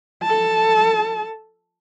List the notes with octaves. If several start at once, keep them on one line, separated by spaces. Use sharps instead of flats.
A4 A5